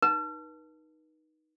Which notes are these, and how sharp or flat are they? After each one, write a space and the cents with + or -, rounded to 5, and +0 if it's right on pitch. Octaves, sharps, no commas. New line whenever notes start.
D#4 +0 B4 -40